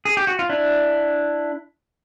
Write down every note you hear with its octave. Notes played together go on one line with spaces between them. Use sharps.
G#4
G4
F#4
F4
D4 E4